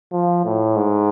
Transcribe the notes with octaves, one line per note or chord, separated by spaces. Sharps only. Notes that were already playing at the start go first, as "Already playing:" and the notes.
F3
A2
G#2